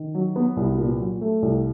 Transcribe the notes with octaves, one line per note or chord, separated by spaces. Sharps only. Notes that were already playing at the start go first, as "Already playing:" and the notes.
Already playing: D#3
F#3
B3
C2
A#2
F#3
A3
C2